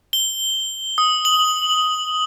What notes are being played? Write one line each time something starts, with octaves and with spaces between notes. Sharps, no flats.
G7
D#6
F#7